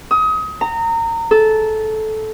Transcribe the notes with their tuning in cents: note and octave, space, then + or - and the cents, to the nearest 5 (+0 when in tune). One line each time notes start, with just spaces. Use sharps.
D#6 +30
A#5 -25
A4 -15